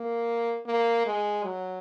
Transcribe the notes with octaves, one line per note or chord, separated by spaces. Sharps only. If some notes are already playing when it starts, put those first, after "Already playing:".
Already playing: A#3
A#3
G#3
F#3